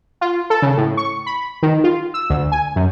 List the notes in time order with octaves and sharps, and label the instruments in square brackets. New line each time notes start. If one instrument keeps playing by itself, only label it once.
[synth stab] F4
A4
C#3
A2
C#6
B5
D#3
F4
E6
D2
G#5
F#2